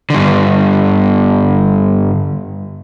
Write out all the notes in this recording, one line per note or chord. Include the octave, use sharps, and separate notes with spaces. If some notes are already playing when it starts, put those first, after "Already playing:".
G2 D3